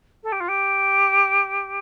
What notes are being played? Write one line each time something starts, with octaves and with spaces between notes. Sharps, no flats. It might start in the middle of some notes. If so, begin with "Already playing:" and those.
A4
G4
F4
G4